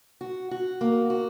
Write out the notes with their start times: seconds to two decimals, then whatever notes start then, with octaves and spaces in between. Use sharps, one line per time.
0.21 F#4
0.51 F#4
0.81 A#3
1.10 F#4